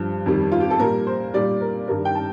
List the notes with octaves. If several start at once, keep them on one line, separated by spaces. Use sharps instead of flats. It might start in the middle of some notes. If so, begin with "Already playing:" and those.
Already playing: G2 F3
F2 D#3 G3
F4
G4
A4
A#2 G3 A#4
C5
A#2 G3 D5
A#4
G2 D#3 G3 A#4
G5
A5